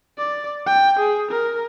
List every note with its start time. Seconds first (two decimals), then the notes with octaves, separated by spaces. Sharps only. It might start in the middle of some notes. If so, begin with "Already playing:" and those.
0.18 D5
0.67 G5
0.99 G#4
1.31 A#4